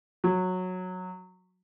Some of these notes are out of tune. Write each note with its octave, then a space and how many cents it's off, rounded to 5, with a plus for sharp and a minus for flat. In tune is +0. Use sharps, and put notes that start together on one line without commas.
F#3 -10